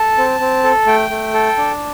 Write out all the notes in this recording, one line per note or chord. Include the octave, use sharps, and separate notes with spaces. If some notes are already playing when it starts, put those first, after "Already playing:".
Already playing: A4 A5
C4
C4
A4
A3 G5
A3
A4
D4